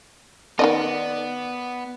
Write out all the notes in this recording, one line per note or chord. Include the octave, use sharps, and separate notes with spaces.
D#3 B3 D#4 D5 D#5